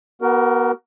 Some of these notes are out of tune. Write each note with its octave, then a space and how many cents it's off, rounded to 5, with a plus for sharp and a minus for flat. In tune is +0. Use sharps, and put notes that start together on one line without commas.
B3 -25 F#4 +30 A#4 +0